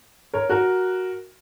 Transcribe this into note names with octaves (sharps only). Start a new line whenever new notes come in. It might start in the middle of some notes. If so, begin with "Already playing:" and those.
A#4 C#5
F#4 A#4